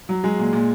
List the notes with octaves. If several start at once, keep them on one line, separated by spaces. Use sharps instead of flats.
F#3
F#3 G#3 G#4
A#2
A#2